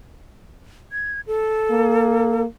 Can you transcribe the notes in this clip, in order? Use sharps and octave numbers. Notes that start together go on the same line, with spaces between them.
G#6
A4
A#3